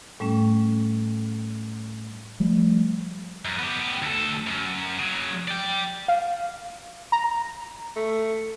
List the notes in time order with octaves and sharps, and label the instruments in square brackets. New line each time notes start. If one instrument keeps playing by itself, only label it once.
[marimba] A2 G3 A3 C#4
[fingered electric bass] F3 G3 A3
[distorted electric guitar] F#2
B3 G4
D2 A4
F#2
C#3 F#3
D5 G5
[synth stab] F5
A#5
[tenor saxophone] A3